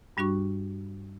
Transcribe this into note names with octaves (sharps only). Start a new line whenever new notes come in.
G2 G3 D4 F#4 C#6